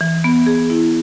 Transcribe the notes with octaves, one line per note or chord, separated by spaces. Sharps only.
E3
B3
G#4
E4